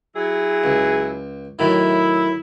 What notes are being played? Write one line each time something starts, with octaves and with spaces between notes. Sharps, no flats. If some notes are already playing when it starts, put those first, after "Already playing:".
F#3 E4 G#4
C#2
A2 D#3 F#3 E4